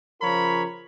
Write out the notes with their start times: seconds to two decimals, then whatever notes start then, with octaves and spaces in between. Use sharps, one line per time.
0.22 C#3 F3 F4 A#4 C#5 B5